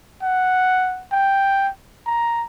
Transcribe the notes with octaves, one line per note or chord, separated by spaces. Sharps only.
F#5
G5
A#5